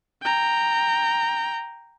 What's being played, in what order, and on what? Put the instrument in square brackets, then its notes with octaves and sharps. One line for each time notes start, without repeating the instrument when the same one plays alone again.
[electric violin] G5 A#5